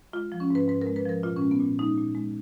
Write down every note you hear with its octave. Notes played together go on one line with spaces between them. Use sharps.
G#3 F4
F3
C#4
G#2 B4
G#2 B4
A#4
G#3
B4
F3 A#4
A#2 F4
C#4
G#3
B3
A#2
G#3 D#4
A#2
G#3